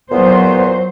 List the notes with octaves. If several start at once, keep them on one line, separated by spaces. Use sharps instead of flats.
E2 A#2 F#3 B3 C5